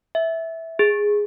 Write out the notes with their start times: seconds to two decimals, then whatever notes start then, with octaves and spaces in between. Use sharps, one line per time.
0.15 E5
0.79 G#4